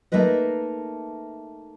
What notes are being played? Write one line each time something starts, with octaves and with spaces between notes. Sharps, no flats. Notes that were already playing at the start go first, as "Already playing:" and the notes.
A3 A#3 D#4 B4 D#5